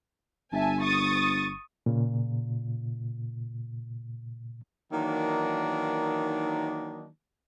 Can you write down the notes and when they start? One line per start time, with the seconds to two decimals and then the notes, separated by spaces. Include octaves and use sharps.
0.53 G1 E5 G#5 A5
0.82 C#6 D#6 A6
1.86 A#2 C#3
4.93 D#3 E3 F#3 A#3 D4 D#4